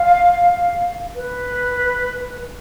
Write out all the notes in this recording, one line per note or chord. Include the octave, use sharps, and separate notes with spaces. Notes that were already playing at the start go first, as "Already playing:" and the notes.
Already playing: F5
B4